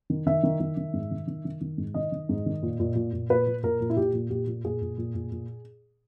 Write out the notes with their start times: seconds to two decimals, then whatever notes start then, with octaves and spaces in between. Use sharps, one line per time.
0.10 D#3
0.26 D#3 E5
0.43 D#3
0.60 D#3
0.77 D#3
0.94 G#2
1.11 D#3
1.27 D#3
1.45 D#3
1.61 D#3
1.78 G#2
1.94 D#3 D#5
2.12 D#3
2.29 G#2
2.46 D#3
2.63 A#2
2.80 A#2
2.95 A#2
3.13 A#2
3.30 A#2 B4
3.47 A#2
3.64 A#2 A#4
3.81 A#2
3.90 E4
3.97 A#2 G4
4.14 A#2
4.30 A#2 G4
4.47 A#2
4.64 A#2 G#4
4.81 A#2
4.98 A#2
5.15 A#2
5.32 A#2